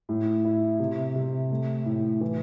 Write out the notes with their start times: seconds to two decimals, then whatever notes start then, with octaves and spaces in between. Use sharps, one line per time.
0.09 A2
0.45 E4
0.80 C3
1.16 C3
1.51 A3
1.86 A2
2.21 E3